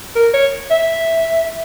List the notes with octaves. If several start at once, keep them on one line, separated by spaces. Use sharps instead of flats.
A#4
C#5
E5